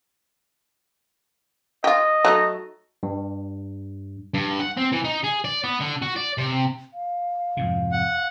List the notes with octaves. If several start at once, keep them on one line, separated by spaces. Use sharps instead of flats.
F4 G4 D#5
F#3 A3 D#4
G2
G2
F#5
C4
E3
D#4
G#4
D5
B3
D3
F#4
D5
C3
F5
F2 G#2 C3
F#5